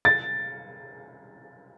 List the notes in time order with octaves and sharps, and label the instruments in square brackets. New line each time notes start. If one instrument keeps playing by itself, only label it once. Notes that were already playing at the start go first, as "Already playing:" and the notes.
[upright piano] A6